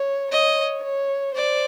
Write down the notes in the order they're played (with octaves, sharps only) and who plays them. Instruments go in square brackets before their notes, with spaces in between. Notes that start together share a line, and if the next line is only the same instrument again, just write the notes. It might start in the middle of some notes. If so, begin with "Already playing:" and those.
Already playing: [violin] C#5
[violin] C#5 [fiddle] D#5
[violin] C#5
[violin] C5 [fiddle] D5